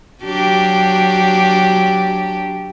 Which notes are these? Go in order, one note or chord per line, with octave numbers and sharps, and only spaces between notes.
F#3 D4 G4